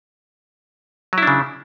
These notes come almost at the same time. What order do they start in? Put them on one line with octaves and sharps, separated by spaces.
F#3 E4 D4 C#3